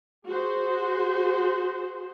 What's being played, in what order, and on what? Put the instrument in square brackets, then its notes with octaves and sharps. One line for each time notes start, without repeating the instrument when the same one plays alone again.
[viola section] F#4 G#4 C5